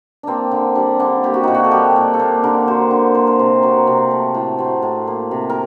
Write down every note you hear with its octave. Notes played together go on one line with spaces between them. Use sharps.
A#3 C4 D4
D3
G3 D4
D3 D4
A#3 G4
F#4
A#2 D#4
F#4
A4
G3 G4
A#2
A4
A#3 A#4
D3 A#4
F#3 C5
D3
A#3 C5
A#4
C3 C5
F#3
C3
A3
A2
F#3 C5
A2
A#3
C3
A#4